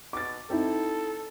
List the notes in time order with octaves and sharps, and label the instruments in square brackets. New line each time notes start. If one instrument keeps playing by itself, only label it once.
[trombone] B2 [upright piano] D6 A6
[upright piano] C4 D#4 E4 [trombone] A4